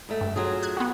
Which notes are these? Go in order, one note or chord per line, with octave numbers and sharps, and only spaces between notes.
G#2 A3
G2
F#3 F4 G#4
F#6 G#6
B3 F#4